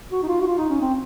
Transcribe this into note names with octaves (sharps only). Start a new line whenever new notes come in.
F#4
D#4
F4
F#4
F4
D#4
C#4
C4